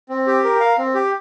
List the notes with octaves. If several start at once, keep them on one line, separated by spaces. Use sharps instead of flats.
C4
G4
A#4
F5
C4
G4